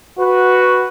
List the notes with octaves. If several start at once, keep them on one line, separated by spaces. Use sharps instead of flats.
F#4 B4